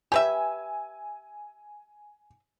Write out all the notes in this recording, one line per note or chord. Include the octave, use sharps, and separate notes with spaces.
G4 B4 E5 G#5